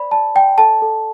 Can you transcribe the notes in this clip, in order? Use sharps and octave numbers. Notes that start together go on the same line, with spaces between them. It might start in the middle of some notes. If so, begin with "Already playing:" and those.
Already playing: C5 D5 B5
D5 A5
D5 G5
A4 A5
A4